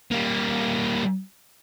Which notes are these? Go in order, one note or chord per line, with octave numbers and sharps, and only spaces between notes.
G3 A#3